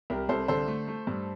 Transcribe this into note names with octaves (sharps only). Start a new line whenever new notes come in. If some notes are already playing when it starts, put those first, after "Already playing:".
C2 G4 A#4
C2 A4 C5
D3 A4 C5
A3
A3
G2